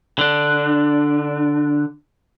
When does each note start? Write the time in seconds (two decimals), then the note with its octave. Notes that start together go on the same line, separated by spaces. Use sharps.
0.19 D3 D4